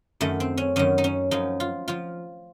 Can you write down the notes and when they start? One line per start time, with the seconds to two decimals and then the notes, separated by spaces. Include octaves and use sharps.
0.21 F#2 D#3 A3
0.40 C4
0.57 C#4
0.76 F#2 D#3 C#4
0.98 D#4
1.04 C#4
1.31 F#2 F3 D#4
1.60 F4
1.88 F3 F4